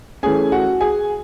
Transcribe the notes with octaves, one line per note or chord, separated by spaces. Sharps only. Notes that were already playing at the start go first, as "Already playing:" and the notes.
E3 A3 C#4 G#4 G#5
F#4 F#5
G#4 G#5